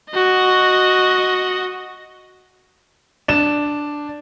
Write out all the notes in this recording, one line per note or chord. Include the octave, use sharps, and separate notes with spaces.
F#4 D#5
D4 E7